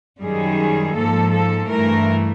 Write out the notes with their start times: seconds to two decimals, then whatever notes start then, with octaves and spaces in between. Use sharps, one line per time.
0.22 F#2 D#3 G3 G#4
0.96 G#2 F3 A#3 A4
1.33 A4
1.69 G2 E3 A3 A#4